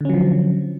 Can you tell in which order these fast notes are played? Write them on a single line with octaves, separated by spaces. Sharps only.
D3 C#4 F#3 F3